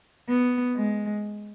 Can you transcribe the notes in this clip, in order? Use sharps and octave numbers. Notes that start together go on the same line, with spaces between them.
B3
G#3